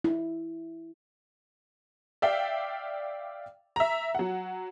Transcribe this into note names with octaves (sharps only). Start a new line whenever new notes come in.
E4
D5 E5 F5 G5
E5 A#5
F#3 F#5